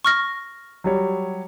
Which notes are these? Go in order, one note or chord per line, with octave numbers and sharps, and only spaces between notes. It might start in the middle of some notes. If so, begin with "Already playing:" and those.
C#6 F6 A#6
F#3 G3 C#5